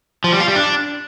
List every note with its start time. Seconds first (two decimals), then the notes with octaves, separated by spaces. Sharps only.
0.24 F3
0.32 G3
0.40 F4
0.48 G3
0.56 D4